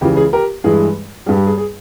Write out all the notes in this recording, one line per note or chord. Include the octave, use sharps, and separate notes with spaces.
C#2 C#3 E3 G4
G#4
G4 A#4
G2 E3 G#3 G#4
G2 G3 G#4
G4
G#4
G#4